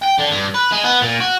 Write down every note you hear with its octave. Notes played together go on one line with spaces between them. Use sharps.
G5
D3
G2
B4
G#3
B3
A#2
F#4